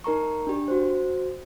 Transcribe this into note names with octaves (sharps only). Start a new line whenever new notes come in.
D#4 A#4 A#5 C#6
D4 G4
F#4 C5